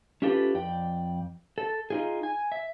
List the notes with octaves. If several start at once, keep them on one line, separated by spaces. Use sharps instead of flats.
C#4 E4 F4 G4 A4 B4
F2 D5 G5
A4
D#4 F4 G#4
G#5
E5